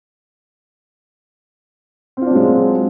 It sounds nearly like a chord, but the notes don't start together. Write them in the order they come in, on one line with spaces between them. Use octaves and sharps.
C4 F4 D4 F#3 G#3